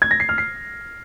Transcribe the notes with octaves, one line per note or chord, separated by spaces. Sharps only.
G#6
A#6
C7
F6
C7